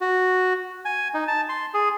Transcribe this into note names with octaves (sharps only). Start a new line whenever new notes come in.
F#4
G#5
D#4
A5
C6
G#4